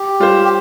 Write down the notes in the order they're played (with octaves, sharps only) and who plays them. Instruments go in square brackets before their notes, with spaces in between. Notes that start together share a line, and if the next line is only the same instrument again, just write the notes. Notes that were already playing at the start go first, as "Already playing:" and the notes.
Already playing: [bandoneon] G4
[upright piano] G3 F4 C5
[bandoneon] G4